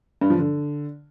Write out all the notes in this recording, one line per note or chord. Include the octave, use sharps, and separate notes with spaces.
G2
F3
D3